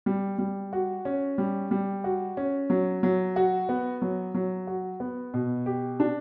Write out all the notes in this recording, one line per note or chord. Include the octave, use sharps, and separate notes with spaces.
G3
G3
F#4
C#4
G3
G3
F#4
C#4
F#3
F#3
F#4
B3
F#3
F#3
F#4
B3
B2
G4
D4